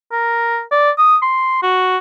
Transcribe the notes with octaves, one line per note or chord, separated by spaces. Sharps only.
A#4
D5
D#6
C6
F#4